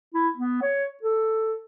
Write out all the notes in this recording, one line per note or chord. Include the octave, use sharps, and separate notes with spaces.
E4
B3
C#5
A4